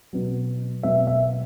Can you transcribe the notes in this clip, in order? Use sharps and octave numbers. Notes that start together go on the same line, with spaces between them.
B2 F#3
B2 F#3 E5
E5